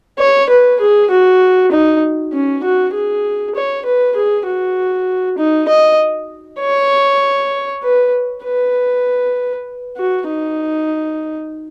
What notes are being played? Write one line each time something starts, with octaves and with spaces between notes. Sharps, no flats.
C#5
B4
G#4
F#4
D#4
C#4
F#4
G#4
C#5
B4
G#4
F#4
D#4
D#5
C#5
B4
B4
F#4
D#4